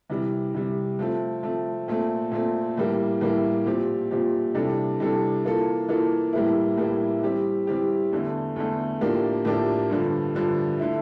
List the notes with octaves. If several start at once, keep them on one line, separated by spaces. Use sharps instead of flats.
C3 E3 G3
C3 E3 G3
F3 A3 C4
F3 A3 C4
A#2 A3 C4
A#2 A3 C4
A2 E3 G3 A#3
A2 E3 G3 A#3
A#2 F3 C4 G4
A#2 F3 C4 G4
C3 E3 G3 D4 A4
C3 E3 G3 D4 A4
E3 A#3 F4 A4
E3 A#3 F4 A4
A2 E3 G3 A#3 E4
A2 E3 G3 A#3 E4
E3 G3 C4 G4
E3 G3 C4 G4
E2 D3 A3
E2 D3 A3
A2 F3 A#3 D4 G4
A2 F3 A#3 D4 G4
G2 D3 F3
G2 D3 F3
D3 A3 E4